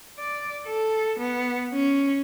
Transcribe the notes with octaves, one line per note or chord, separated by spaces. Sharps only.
D5
A4
B3
C#4